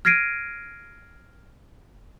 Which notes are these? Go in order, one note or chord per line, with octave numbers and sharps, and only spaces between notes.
F6 G#6 A#6 C7 D7 D#7